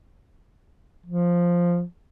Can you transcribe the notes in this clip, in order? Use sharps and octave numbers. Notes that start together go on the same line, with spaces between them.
F3